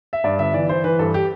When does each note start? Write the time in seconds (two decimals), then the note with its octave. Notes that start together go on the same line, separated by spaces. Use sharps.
0.13 E5
0.24 G2 D5
0.39 G1 E5
0.54 E3 D5
0.69 E3 C5
0.84 E3 B4
0.99 G2 A4
1.14 G4